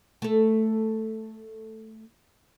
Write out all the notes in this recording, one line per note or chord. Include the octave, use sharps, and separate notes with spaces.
A3 A4